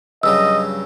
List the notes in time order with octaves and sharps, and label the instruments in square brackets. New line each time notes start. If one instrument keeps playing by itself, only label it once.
[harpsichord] G2 C#3 F#3 [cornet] D#5 [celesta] E6